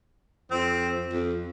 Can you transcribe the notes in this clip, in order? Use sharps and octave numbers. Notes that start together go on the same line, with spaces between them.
F2 C4
F2